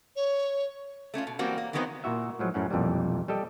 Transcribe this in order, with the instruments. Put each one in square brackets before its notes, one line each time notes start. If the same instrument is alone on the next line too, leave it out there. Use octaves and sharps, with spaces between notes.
[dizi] C#5
[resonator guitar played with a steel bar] A3 C#4 D4 F4
B2
E3 F#3 G3 A#3 C4 F#4
A#3
D#3 E3 F#3 B3 C4 D#4
[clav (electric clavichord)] A#2 E4 F#4 E5
A2 F3 F#3 G#3
F#2 A2 C#4 F#5
B1 F2 A#2 E3 G3
G3 G4 A4 D#5